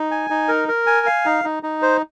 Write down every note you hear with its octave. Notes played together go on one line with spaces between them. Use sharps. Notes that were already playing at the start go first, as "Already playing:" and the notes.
Already playing: D#4
G#5
D#4
A#4
A#4
G#5
F5
D#4
D#4
D#4
C5